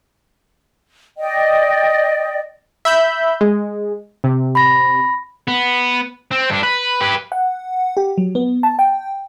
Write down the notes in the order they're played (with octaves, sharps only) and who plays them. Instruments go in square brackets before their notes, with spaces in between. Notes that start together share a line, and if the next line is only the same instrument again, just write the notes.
[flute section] D5 D#5 G5
[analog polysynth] E5 B5 G6
G#3
C3
[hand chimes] B5 A#6
[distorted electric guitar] B3
C4
G2 D4
B4
G4 B4
[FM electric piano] F#5
G4
F#3
B3
A5
G5